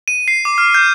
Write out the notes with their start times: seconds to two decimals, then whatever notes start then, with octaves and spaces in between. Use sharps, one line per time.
0.08 D#7
0.28 C7
0.45 D6
0.58 F6
0.74 G6